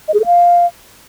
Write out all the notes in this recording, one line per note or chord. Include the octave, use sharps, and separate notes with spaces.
D#5
G#4
A4
F5